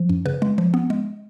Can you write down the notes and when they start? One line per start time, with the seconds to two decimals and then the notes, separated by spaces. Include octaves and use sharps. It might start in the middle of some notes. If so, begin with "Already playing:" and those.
Already playing: F3
0.09 F#2
0.26 C#3 B4
0.42 G#3
0.58 F3
0.74 B3
0.90 G#3